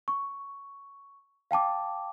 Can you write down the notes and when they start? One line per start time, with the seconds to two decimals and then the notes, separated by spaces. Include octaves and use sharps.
0.08 C#6
1.51 F5 G5 A5 D6